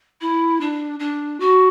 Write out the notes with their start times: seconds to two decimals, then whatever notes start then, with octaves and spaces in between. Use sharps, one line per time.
0.20 E4
0.60 D4
0.99 D4
1.39 F#4